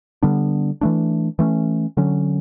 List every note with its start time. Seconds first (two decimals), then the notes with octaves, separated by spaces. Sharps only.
0.23 D3 G3 B3 D4
0.81 E3 A3 D4
1.39 E3 A3 C#4
1.97 D3 F#3 C#4